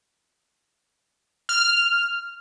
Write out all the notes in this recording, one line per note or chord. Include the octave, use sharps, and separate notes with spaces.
F6